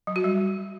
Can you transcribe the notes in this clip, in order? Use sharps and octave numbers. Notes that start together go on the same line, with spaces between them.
F#3
F#4
G3